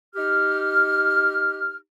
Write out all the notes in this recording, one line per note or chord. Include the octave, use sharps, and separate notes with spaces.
D#4 G4 F6